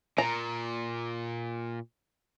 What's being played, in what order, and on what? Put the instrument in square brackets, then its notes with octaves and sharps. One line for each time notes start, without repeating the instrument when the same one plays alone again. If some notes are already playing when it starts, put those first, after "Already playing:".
[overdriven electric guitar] A#2 [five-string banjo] A#5